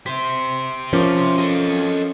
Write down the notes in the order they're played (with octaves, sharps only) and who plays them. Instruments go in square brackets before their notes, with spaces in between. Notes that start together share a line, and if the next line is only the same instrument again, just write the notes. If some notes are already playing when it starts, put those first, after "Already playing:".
[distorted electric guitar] G4 C5 [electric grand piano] B6
[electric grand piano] F3 A#4 D6 [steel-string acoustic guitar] C#4
[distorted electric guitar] A4 D#5